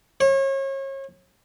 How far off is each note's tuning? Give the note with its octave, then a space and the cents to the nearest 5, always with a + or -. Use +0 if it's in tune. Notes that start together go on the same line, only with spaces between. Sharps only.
C#5 -35